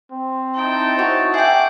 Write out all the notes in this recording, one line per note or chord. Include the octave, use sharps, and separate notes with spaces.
C4
D#4 E4 G5 A5
F#4 C#5
G#4 E5 F#5 G5 D6